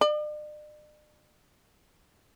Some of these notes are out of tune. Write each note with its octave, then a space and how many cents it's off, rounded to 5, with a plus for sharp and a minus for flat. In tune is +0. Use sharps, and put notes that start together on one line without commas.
D5 +45